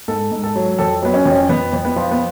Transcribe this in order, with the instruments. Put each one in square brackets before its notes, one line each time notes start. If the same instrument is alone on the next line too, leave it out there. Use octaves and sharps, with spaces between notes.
[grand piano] G#2 A4
G#2
A4
F#3
F2 A4
F#3 B3
C#4
F2
C#4
F2 B3
F2
B3
F3
B3